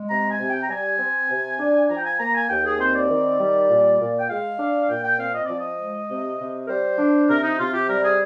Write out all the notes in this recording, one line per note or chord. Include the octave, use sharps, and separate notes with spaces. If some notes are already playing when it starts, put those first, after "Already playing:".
Already playing: G#3
C3 A#5
G#5
C3
G5
A#5
G3 G#5
C4
C3
D4
F3 A#5
G5
G#5
A#3 A#5
G#5
D#2 G5
G#4
C4 C5
D5
D#3
G3
A#2
A#2
G5
G#3 F5
D4
A#2 G5
G5
C4 F5
D#5
F3 D5
D#5
G#3
C3
C3
A#4
G3 C5
D4
C3 A#4
D#4
C3 F4
G4
G3 A#4
G#4